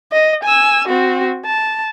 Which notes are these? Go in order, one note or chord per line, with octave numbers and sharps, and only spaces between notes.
D#5
G#5 E6
C4 F#4
A5